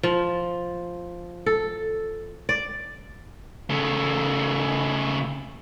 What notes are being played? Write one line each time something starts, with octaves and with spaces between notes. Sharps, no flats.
F3
A4
D5
C#3 A3